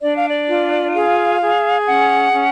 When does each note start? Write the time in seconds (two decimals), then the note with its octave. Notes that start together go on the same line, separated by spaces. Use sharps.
0.02 D4 D5
0.15 F5
0.28 D5
0.48 F4
0.95 G#4 F5
1.41 G#4
1.86 C#4 F#5
2.33 C#4